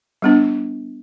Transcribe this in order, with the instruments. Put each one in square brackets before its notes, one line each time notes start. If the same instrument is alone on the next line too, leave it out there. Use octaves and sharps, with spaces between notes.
[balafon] G3 B3 D4